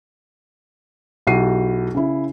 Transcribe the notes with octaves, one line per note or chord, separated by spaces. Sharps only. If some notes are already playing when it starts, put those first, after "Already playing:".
B1 E4 F#4 G4 C7 D#7
C#3 E4